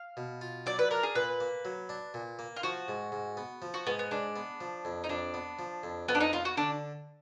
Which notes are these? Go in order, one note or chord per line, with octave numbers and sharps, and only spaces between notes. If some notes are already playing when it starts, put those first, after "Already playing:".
Already playing: F5
B2
F4
F#3 D5
B4
D4 A#4
G#4
A#2 B4
A#3
F#3
D4
A#2
A#3
F4
F3 F#4
G#2
G#2
B3
F3
F#4
G#2 B3
B3
G#2 D4
B3
F3
F2
D#4
F2 D4
B3
F3
F2
F2 B3
D4
D#4
B3 F4
F#4
D3 D4